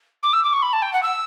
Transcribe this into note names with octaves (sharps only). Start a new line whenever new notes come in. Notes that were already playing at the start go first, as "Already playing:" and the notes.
D6
E6
D6
C#6
B5
A5
G5
F#5
E6